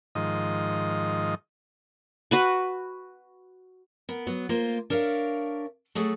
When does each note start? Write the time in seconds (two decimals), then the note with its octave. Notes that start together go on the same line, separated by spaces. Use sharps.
0.15 G#2 D#3 F3 D#5
2.31 F#4 B4 C#6
4.09 B3 A#4
4.27 F#3 B3
4.49 A#3 F4 C5
4.90 D4 A#4 C#5 E5 F5
5.95 F#3 A3 G#4 A4